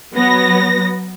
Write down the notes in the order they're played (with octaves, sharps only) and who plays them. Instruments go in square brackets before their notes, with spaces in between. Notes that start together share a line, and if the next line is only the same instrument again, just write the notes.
[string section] F#3 B3 A#6